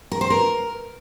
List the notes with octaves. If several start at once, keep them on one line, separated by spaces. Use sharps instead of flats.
A#4
C5
A#4